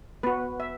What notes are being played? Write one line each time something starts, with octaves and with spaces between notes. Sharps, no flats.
B3 F#4 B4
E5